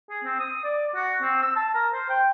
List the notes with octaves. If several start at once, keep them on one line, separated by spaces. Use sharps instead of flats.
G#4
C4
D#6
D5
F#4
C4
E6
A5
A#4
C5
G5